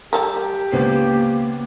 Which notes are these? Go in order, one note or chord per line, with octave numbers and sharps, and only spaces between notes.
G3 G4 A4 A#4
C#2 A#3 B3 C5